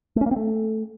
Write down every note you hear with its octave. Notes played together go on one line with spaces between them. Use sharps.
A3
C#4
A#3
C4
A3